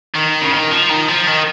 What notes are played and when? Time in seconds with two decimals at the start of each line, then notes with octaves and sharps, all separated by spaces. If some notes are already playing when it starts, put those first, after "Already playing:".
0.15 D#3
0.42 C#3
0.52 D#3
0.71 F3
0.89 D#3
1.08 F3
1.27 D#3